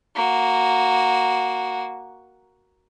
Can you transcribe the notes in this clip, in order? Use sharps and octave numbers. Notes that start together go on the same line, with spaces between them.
A#3 F#4